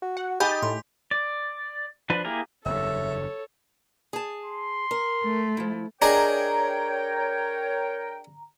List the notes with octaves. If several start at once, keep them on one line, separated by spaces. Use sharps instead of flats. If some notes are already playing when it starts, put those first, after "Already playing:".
F#4
F#5
D#4 G4 G#5 B5 D#6 G6 A6
A2 C6
D5
F3 D4 B4
A#3 E4 G4 G#4 A#4
F#1 E2 G2 A4 C#5 E5
G#4 A5
C6
A#4
A3
F3 E4
D4 G#4 A#4 C#5 D#5 G5 A#5